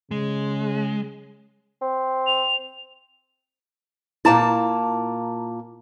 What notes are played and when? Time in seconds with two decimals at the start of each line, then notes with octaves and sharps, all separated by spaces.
0.11 C#3 G#3
1.82 C4
2.26 F7
4.25 A#2 A#3 E4 A5 A#5